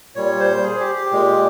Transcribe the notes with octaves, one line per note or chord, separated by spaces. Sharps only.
A#2 G3 C#5
C5
G#4
G4
G4
A#2 G#3